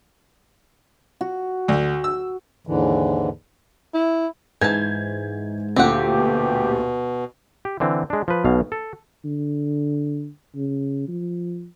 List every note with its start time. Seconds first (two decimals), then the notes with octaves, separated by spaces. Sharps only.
1.21 F#4
1.68 D2
2.04 E6
2.67 D#2 G#2 D3 E3
3.94 E4
4.62 G#2 E3 A5 G6 G#6
5.76 D2 A#2 D3 C4 G4 F#5
6.12 B2
7.65 G4
7.80 D3 E3 C4
8.10 G#3 D4
8.28 F3 B4
8.44 B1 B2 F5
8.72 A4
9.25 D3
10.55 C#3
11.08 F3